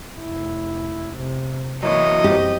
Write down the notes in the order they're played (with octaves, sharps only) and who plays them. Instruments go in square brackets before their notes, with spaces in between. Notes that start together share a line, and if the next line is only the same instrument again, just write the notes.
[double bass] F1 E4
C3
[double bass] E3 A#3 [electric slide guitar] F#3 E4 C#5 [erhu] D#5
[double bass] F#2 C4 [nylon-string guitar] G4